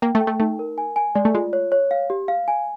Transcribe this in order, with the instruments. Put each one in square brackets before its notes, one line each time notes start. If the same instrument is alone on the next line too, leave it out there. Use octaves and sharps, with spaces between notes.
[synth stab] A#3 [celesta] G5
[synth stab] A3
[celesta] G5
[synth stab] A3
[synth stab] A3 [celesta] D#4
[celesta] A#4
G#5
G#5
[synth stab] G#3 [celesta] D5
[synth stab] A3
[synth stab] G#3 [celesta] F4
[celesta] C#5
C#5
F5
G4
F5
G#5